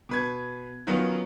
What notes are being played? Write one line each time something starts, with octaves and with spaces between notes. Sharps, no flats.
B2 B4 G#6
D#3 F#3 B3 C#4 D#4 F4